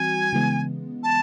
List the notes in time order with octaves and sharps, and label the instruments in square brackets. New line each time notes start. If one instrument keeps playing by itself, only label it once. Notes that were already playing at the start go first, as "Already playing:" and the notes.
Already playing: [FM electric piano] E3 G3 C4 F#4 [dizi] G#5
[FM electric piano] C#3 E3 G#3 B3
[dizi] A5